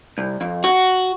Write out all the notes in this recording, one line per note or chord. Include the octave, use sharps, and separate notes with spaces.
C2
F2
F#4